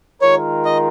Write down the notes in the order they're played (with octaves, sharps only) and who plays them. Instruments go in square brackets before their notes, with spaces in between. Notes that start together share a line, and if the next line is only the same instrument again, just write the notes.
[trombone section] D#3 G#3 F4 A#4 [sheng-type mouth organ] C#5
[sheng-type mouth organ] D#5